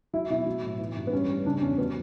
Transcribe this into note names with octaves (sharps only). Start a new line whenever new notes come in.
F#3 E4
B2 E4
F#3
A2
E3
G2
B3
G3 C#4
G3
C#3 D4
E2 C#4
F#3 B3